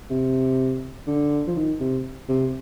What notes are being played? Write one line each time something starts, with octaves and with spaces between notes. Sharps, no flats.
C3
D3
F3
D#3
C3
C3